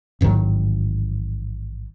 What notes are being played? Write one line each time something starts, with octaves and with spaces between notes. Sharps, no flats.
A1 G#2 D#3 F#3